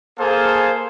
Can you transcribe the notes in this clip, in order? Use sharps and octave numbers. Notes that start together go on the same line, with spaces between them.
A#3 G#4 A4 C5 F5